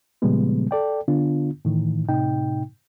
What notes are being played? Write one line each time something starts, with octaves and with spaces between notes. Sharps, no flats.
A#2 C#3 F3 G3 G#3 B3
A4 D5 G5
D3 B3 D4 F4
A2 D#3 E3
A2 C3 D#4 G5